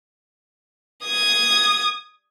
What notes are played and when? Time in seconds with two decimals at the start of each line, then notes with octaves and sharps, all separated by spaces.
1.05 D#6 G#6